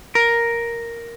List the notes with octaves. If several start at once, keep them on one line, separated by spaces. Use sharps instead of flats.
A#4